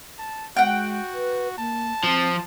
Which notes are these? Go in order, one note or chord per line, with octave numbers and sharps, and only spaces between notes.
A5
G#3 F#4 F#5 G5
B4
A#3 A5
F3 C4